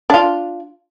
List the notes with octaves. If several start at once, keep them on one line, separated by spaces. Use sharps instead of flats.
D4 F4